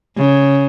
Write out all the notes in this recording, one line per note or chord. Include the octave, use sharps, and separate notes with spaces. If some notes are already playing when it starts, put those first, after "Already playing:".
C#3